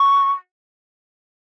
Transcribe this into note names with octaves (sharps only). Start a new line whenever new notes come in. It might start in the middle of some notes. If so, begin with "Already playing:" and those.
Already playing: C#6